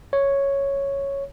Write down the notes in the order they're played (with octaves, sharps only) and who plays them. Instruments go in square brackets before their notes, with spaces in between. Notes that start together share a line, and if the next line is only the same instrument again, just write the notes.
[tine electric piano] C#5